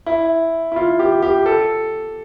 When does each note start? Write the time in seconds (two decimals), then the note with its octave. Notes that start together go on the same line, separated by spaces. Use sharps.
0.06 E4
0.72 E4
0.76 F4
0.99 G4
1.22 G4
1.46 A4